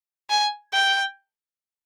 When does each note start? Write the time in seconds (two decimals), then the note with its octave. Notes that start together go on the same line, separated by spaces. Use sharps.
0.30 G#5
0.73 G5